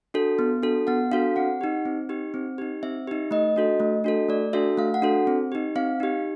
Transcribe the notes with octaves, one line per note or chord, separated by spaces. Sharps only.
D4 F#4 A4
B3
D4 F#4 A4
B3 F#5
D4 F#4 A4 F5
C4 F#5
D#4 G4
C4
D#4 G4
C4
D#4 G4
C4 E5
D#4 G4
A3 D#5
D4 F#4 A4
A3
D4 F#4 A4
A3 D5
D4 F#4 A4 E5
A3 F5
F#5
D4 F#4 A4
C4
D#4 G4
C4 F5
D#4 G4